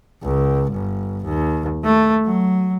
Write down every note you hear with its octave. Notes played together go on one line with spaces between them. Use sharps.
C#2
G1
D#2
A3
F#3